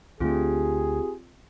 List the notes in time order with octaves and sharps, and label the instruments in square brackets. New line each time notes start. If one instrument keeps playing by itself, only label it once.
[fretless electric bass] D2 D3 A3 [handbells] C4 F4 [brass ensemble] G4 G#4